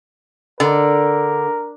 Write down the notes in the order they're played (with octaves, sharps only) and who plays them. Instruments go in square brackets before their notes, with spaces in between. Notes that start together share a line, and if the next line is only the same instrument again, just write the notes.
[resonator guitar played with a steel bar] D3 [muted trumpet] A#4